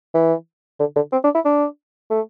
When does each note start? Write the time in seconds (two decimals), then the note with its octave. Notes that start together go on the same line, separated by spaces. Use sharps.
0.14 E3
0.80 D3
0.96 D3
1.13 C4
1.24 D4
1.35 E4
1.45 D4
2.11 A3